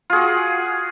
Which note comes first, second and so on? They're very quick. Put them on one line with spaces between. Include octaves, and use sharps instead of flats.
F4 G#4 F#4